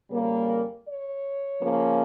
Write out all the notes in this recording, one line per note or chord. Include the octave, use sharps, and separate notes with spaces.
F2 C#3 G3 A#3
C#5
C#3 F3 A#3